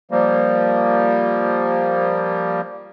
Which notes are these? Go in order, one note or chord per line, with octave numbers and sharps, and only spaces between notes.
F3 G3 A#3